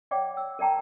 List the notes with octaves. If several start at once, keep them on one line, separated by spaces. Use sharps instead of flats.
C#5 D5 F#5 G5 D6
E6
A#4 D5 G5 A5 A#5